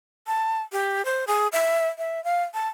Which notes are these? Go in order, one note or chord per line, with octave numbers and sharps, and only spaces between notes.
A5
G4
C5
G#4
E5
E5
F5
A5